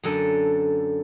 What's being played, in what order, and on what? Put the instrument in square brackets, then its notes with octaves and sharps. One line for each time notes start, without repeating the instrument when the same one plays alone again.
[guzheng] F#2 D3 A4